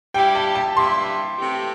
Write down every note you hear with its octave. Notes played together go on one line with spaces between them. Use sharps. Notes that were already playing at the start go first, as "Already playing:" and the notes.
G2 G3 E4 G4 G5
A5
A5
G2 G3 E4 G4 C6
C3 E3 A3 C4 G4